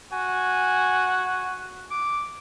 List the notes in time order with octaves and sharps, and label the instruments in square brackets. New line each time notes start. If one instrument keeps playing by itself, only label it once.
[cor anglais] F#4 [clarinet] G#5
[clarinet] D6